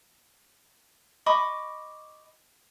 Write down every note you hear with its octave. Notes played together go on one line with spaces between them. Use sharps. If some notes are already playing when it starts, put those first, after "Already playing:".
D#5 B5 C#6 D6